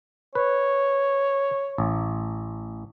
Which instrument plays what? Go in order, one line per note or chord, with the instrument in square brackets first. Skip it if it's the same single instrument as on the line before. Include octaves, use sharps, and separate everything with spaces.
[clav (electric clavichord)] B4 [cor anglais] C#5
[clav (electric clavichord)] A1